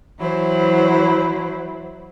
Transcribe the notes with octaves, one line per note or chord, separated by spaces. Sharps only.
E3 F#3 E4 C5